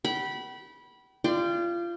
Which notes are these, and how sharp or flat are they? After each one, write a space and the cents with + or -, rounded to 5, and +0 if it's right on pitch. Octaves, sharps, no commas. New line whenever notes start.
G5 -45 B5 -15
F4 -25 D5 +15 G5 +5